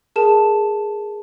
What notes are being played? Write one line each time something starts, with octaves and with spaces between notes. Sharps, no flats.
G#4 A#4 A5 E7